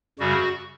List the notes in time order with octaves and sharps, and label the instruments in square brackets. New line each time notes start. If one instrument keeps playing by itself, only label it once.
[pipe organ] F#2 C#3 G3 F#4